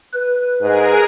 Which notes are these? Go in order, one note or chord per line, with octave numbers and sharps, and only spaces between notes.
B4
G#2 G#4 A#4